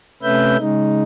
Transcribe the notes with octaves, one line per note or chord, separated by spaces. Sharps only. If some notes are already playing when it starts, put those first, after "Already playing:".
C3 A3 C#4 B4 E5 G6
C#3 G#3 D#4